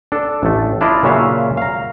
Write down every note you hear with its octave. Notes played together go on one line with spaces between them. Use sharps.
D4 A4
A1 A3
D4 E4 F4 D5 D#5
A#2 C#3 F#3 C#4 E5 F5
F5 A#5